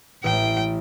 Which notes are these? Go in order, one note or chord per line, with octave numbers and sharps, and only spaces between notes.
A1 G5